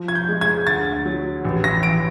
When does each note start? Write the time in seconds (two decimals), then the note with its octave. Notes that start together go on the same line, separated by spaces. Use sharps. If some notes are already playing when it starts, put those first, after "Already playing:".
Already playing: F3
0.08 G#6
0.15 G6
0.29 G#3
0.41 G#6
0.67 D2 A6
1.05 F#3
1.44 A1
1.64 A#6
1.83 E3 D7